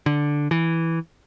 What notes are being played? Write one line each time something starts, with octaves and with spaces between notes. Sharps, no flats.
D3
E3